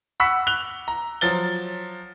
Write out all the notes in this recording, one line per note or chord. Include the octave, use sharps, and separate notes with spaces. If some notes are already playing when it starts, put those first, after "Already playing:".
F#5 B5 C#6 E6 B6
F#6 F7 G7
A#5
F3 F#3 A6 G7